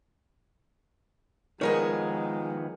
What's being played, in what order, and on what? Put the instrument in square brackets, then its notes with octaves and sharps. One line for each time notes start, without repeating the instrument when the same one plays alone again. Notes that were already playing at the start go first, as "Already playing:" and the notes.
[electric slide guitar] D#3 F3 B3 [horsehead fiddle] G#3 [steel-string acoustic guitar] G#4 A#4 C#5